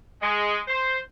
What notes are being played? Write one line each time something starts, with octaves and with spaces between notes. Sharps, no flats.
G#3
C5